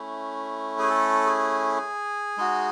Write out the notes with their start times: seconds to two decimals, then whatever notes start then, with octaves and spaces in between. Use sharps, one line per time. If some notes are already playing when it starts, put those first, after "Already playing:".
Already playing: A3 C#4 E4
0.79 G#4
0.90 A4
1.26 G#4
2.37 G#3 D#4 F#4